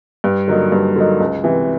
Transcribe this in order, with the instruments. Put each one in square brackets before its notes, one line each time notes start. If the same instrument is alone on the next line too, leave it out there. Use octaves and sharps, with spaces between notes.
[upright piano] G2
D3 F#3 A#3 D#4
G2
D3 F#3 A#3 D#4
C#2
C3 E3